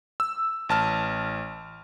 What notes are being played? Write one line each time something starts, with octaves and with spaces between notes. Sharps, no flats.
E6
A1 A5 F6